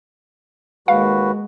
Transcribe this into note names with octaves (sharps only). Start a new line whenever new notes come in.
D#2 G#3 F#4 B4 F5